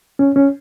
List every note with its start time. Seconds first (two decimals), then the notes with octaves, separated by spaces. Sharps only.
0.19 C#4
0.36 C#4